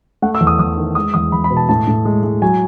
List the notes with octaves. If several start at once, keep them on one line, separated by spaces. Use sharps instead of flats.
A3 F#5
E6
E2
D#6
E2 D#6
D#3
G#3 D#6
E2 D#6
E2 B5
B5
B2
A5
A2 A5
A2
G#3
G#3
F#3 G#5